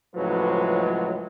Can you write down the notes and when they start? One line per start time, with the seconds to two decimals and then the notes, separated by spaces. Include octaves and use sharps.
0.16 C#2 A2 F3 F#3 G#3 B4